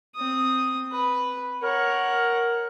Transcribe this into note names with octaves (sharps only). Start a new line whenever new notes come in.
C4 D#6
B4
A#4 C#5 F#5